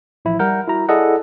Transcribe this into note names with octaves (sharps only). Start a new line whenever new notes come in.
A1 F3 E4
G3 A#4 F#5 G6
E4 F#4 A#5
E4 G#4 A4 D5 D#5 F#5